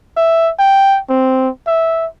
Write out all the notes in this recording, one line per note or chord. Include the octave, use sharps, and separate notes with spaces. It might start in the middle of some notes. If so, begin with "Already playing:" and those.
E5
G5
C4
E5